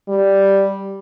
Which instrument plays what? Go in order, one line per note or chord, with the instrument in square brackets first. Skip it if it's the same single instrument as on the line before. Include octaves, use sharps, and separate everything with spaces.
[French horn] G3